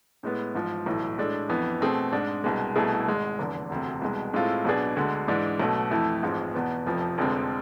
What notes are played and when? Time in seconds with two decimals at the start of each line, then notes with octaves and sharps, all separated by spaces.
0.23 A2 G#3 B3
0.54 A1 G#2 F3
0.86 B1 A2 E3
1.18 A2 G#3 D4 A4
1.49 F2 E3 B3
1.81 B2 A3 C4 G#4
2.12 G#2 G#3 D4
2.44 C2 B2 G#3
2.76 C2 B2 A3 E4 G#4
3.07 G#1 G#2 G#3
3.38 F1 E2 D3
3.70 E1 D2 C3
4.02 C2 B2 G#3
4.33 A2 G#3 C4 F4 A4
4.65 B1 B2 B3 D4 G#4
4.96 D2 D3 G#3
5.28 G#2 E3 G#3 D4
5.60 B1 B2 A3
5.91 F2 E3 A3 E4
6.23 A1 G#2 F3 G#3 C4
6.54 E2 B2 B3
6.86 F1 F2 C3 F3
7.18 F1 F2 D3 G#3 C4